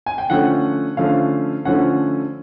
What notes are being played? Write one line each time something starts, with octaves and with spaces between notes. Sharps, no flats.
G#5
G5
D3 F3 A3 C#4 F#5
D3 F3 A3 C#4 F5
D3 F3 A3 C#4 F#5